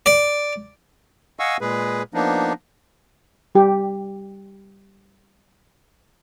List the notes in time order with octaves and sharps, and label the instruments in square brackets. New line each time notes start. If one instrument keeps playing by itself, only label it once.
[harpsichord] D5
[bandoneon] D#5 F5 F#5 G#5 C#6 E6
A#2 G#3 G#4 B4
F3 A#3 B3 D4 D#4
[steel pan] G3 G4